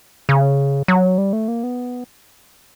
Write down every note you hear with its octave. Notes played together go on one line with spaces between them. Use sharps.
C#3
F#3
G3
A3
A#3
B3